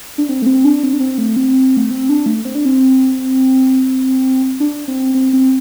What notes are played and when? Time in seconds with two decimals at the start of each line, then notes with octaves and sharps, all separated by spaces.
0.18 D4
0.29 C4
0.42 A3
0.46 C4
0.65 D4
0.83 C4
0.93 D4
1.00 C4
1.18 A3
1.36 C4
1.77 A3
1.91 C4
2.09 D4
2.26 A3
2.45 C4
2.55 D4
2.65 C4
4.60 D4
4.88 C4
5.14 C4
5.33 C4